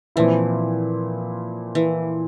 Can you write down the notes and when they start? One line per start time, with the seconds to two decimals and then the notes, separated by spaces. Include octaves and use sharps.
0.16 A#2 E3 F3 C4 E4
1.75 E3